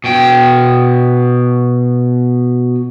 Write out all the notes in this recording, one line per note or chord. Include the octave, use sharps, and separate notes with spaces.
B2 G5